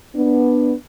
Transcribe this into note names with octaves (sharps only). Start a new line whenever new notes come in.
B3 D4